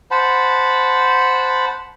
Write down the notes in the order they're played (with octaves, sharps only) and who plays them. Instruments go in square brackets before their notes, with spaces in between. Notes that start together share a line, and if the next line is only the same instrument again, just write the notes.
[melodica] C5 F#5 A5 B5